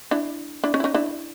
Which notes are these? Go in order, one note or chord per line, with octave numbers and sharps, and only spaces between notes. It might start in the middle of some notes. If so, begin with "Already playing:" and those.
D4 E4
D4 E4
C#4 D#4
E4
C#4 D#4
D4 E4